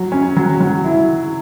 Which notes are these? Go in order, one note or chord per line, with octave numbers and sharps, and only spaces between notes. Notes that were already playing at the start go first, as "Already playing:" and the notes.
Already playing: F#3
C#4
F#3
F#3
E4